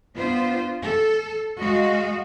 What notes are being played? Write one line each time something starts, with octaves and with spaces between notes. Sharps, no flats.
B3 D4 F4 C5
A4
G#3 F#4 D#5 F5